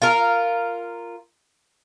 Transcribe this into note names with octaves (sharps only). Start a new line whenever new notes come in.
F4 A#4